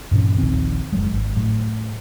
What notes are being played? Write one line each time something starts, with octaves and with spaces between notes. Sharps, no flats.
G2 A#2 E3 C#4
D#1 A#1 D#3 C4
F#1 F#3 G#3
G#1
A2 F#3